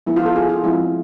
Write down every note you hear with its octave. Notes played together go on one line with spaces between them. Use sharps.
F3 G#3 B3 E4
F4
A4
G#4
F4
F3 G#3 C4 E4